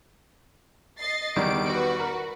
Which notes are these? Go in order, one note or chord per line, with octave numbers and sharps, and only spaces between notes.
D#5 A6 C7
E2 D#3 G3 D7
F#4 B4
A#4